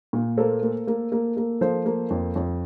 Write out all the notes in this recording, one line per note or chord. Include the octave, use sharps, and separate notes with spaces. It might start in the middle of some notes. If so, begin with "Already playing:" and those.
A#2
A#3 A4 C5
A#3
A#3
A#3
A#3
F3 A4 C5
A#3
F2
F2